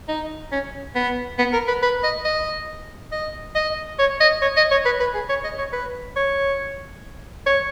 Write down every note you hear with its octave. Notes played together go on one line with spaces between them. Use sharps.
D#4
C#4
B3
B3
A#4
B4
B4
D#5
D#5
D#5
D#5
C#5
D#5
C#5
D#5
C#5
B4
B4
G#4
C#5
D#5
C#5
B4
C#5
C#5